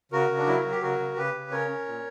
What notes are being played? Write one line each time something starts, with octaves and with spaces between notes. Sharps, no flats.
C#3 F#4 A#4
C#3
D4
F#3 E4
F#3 F#4
G4
C#3 F#4 A#4
C#3
C#3 G4 B4
C#3
C#4 A#4 C#5
C#4
A#2